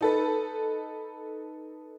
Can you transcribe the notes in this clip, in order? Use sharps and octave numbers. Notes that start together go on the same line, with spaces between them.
D#4 A4 B4